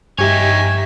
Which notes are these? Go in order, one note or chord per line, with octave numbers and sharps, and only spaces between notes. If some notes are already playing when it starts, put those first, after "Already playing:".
G2 D#4 G4 C#5 E5 G#5